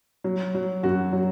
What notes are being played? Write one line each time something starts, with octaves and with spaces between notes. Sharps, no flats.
F#3
F#3
F#2 F#4
F#3